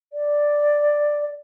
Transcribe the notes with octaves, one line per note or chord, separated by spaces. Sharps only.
D5